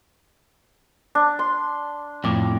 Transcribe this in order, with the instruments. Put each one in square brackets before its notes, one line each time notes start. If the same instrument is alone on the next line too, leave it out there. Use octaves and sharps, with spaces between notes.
[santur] D4
C6
[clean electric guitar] F2 A2 [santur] D6